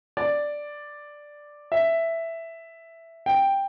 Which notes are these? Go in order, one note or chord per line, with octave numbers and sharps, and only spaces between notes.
D5
E5
G5